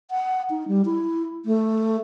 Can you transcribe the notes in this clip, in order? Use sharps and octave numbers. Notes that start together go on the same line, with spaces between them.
F#5
D#4
G3
E4
A3